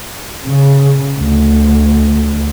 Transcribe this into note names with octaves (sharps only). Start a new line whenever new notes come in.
C#3
D2